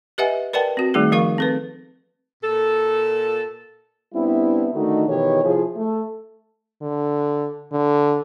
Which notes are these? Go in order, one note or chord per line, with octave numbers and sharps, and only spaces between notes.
G4 B4 D#5 E5 F#5 G#5
A#4 B4 D5 F#5 G5 A5
C4 F#4
D#3 G3 A3 D#4 G#4
F3 A#4 F5 C#6
C4 A4 B4
A#2 A4
G3 B3 C4 D4 E4
D3 D#3 A3 D4 D#4 F#4
B2 D#3 E3 G4 C#5
C3 F3 E4 F4 G#4
A3
D3
D3